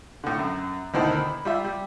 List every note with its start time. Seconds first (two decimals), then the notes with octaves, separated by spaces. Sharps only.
0.24 A2 D3
0.39 F#2
0.94 D2 B2 D#3 E4 C5 A5
1.17 B5
1.45 G3 F4 E5
1.64 G3